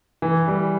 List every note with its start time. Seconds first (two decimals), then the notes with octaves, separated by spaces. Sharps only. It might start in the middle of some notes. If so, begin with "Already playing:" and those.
0.22 E3
0.48 G3